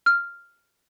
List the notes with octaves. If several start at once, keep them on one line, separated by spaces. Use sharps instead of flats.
F6